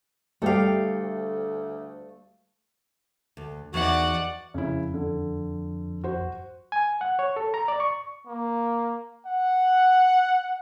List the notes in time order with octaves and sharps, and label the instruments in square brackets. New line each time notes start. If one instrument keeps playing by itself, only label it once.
[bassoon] D2 [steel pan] G3 G4 [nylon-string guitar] A3 F5
[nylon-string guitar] D2
[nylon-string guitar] E2 D#4 [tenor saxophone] F#4 [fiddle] D5 F#5
[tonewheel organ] F2 [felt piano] C#3 E4
[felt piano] D3
F#4 C5
[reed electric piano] G#5
F#5
C#5
A4
A#5
D5
C#6
[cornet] A#3
F#5